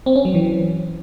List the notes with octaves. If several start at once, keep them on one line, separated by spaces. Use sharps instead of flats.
C4
C#4
F#3
E3